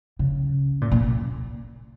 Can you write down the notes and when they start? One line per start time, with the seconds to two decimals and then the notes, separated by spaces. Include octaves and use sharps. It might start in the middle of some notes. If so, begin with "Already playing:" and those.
0.19 C#3
0.81 A#2
0.92 A#2